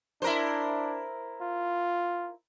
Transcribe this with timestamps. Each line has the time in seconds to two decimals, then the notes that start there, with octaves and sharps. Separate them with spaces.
0.22 D4 E4 A#4 C5
1.41 F4